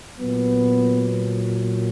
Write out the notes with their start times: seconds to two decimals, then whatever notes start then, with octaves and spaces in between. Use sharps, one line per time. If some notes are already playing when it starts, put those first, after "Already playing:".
0.19 A#2 F#3 B3